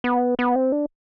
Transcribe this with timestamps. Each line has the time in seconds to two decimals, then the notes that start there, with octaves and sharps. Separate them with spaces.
0.04 B3
0.39 B3
0.56 C4
0.72 D4